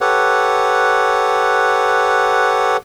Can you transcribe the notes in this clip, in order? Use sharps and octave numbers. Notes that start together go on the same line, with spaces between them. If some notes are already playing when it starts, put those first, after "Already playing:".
G4 A4 B4 C#5 F#5